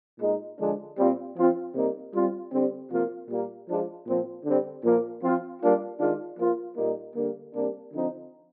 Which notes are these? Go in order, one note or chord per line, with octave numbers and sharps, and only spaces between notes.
A#2 G#3 D#4
D3 F3 G#3 D4
A#2 G3 C4 F4
F3 C4 F4
C3 G3 A#3 D#4
G3 C4 F4
D3 G3 C4
C3 F3 A#3 F4
A#2 G3 A#3
F3 G#3 D4 F4
A#2 F3 C4
D3 G3 C4
A#2 F3 A#3 F4
F3 C4 F4
G3 A#3 D4 F4
D#3 G#3 D4 F4
F3 A#3 F4
A#2 G3 A#3 D#4
D3 G3 A#3
C3 G3 A#3 D4
D3 F3 C4 D#4